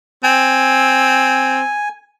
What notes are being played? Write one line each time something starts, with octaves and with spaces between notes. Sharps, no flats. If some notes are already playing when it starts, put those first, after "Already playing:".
C4 G#5